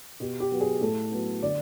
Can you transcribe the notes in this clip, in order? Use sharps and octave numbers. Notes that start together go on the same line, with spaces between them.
B2 G4
G4
F#3 B3
G#4
A2 A4
F#3 B3
D3 D5